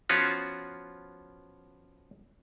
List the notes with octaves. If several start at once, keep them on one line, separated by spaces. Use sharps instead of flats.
F3 B3 C#4 F4 F#4